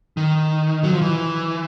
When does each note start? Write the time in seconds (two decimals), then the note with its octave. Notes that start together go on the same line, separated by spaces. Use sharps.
0.17 D#3
0.83 F#3
0.92 F3
1.02 E3